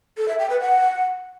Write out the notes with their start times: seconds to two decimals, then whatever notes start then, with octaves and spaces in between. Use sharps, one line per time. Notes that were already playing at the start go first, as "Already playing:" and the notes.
0.17 A4
0.28 E5
0.39 G5
0.50 B4
0.61 F#5